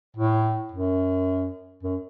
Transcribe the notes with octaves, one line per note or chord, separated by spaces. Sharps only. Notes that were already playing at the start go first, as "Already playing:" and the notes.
A2
F#2
F#2